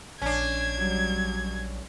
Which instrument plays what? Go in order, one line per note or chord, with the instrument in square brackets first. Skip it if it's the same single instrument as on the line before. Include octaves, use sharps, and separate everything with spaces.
[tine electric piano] A#1 [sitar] C#4 D4 [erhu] G#6
[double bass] F#3 G3